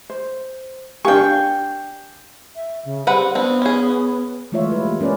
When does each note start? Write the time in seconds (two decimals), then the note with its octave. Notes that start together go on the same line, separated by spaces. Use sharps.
0.10 C5
1.05 D4 G4 F5 G5 G#5 C#6
2.55 E5
2.85 C#3
3.07 G3 C4 B4 F#5
3.35 B3 C4 D4
3.62 C#4 G#4
4.52 E3 G#3 A3 F4 C#5 E5
4.72 G3 B4
4.85 E3 A#3
5.00 G#3 C#4 A#4 B4 D5